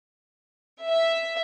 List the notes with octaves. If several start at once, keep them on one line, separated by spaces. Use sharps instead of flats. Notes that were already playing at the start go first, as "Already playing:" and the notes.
E5